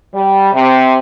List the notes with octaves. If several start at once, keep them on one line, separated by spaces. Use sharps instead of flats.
G3
C3